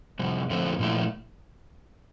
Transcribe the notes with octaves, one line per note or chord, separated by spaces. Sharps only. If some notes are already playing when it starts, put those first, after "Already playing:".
F2 C3 G3
F2 D3 A3 C4
A#2 F3 A3 E4